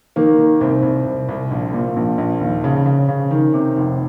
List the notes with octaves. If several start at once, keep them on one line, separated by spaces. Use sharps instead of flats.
D#3 A#3
D#3
C2 C4
C2
C2
C2
A#1
A#2
A#1
A#1
D#2
C#3
C#3
C#3
D#3
C3
F1